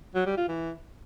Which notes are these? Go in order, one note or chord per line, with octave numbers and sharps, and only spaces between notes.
F#3
G3
F4
E3